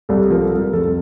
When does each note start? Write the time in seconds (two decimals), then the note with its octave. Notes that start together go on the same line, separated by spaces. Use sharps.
0.09 C2 A4
0.31 F3 A#4
0.42 A4
0.53 C2
0.73 F2 A4